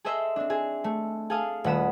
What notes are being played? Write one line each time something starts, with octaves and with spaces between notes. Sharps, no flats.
G#4 A4 C5 D#5 E5
C4 D4
C4 G#4
A3
G#4 A4 F5 A5 D#6
D#1 A3 F#5 B5 D#6 E7